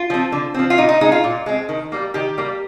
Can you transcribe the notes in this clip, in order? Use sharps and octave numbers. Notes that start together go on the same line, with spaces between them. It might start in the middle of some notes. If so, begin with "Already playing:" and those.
Already playing: F4
F3 C4
D3
F3 C4
F4
A#2 D#4
D#4
G#3 C4 D#4
F4
A#2
G#3 C4
D#3
G3 A#3
D#3 G4
G3 A#3